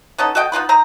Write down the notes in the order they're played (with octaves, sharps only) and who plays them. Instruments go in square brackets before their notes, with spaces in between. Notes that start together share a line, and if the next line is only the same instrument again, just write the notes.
[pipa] B3 C#4 D#4 A4
F#4 A4 D#5 G5
B3 D#4 F4 B4
C4 D#4 A#5